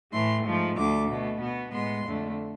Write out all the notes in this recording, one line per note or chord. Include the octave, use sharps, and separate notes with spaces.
A2 E3 A3 C6
G#2 F3 A3
D2 D3 A3 D6
B2 A3
B2 B3
A2 G#3 B3 C6
F2 D3 A3